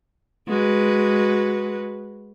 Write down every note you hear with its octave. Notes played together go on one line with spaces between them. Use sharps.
G#3 F#4 B4